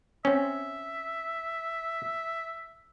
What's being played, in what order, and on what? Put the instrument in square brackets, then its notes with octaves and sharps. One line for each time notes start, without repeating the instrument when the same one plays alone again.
[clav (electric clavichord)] C4 C#4 [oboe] E5